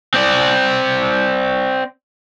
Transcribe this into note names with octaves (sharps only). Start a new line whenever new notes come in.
C4 D5